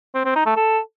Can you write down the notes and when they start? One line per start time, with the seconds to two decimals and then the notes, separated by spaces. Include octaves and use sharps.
0.14 C4
0.25 C4
0.35 D#4
0.46 A3
0.56 A4